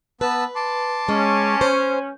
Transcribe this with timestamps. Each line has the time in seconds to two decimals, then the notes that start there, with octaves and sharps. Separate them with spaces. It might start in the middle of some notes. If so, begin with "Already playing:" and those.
0.21 B3 B4 A5 E6
0.56 A5 C6 D6
1.08 G#3 C#4
1.61 C5